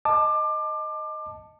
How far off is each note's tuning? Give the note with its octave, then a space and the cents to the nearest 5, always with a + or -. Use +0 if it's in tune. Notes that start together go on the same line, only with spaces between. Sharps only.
D#5 +0 A5 +0 D6 +25